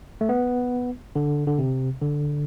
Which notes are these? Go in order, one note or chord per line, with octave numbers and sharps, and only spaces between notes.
A3
B3
D3
D3
C3
D3